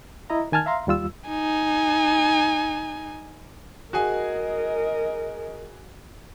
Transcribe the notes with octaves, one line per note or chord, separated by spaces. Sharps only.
E4 D#5 A#5
D#3 G#5 A5 F6 G#6
E5 F5 A#5 C6
D#2 G3 F4 E6
D#4 G#5
F#4 G#4 A#4 D#5 G#5